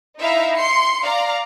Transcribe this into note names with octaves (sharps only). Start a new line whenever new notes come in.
D#4 E4 E5 F5 A#5
C6 C7 C#7
D5 F5 A#5